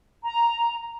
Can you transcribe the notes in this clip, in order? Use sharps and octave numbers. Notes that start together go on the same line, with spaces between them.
A#5